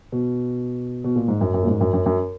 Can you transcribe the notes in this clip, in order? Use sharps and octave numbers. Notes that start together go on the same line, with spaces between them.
B2
B2
A#2
G#2
F#2
F#2
A#2
G#2
F#2
F#2
F#2